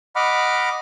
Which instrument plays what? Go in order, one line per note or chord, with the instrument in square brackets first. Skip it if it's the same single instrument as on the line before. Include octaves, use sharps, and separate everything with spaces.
[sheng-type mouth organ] D#5 F#5 B5 D6 F6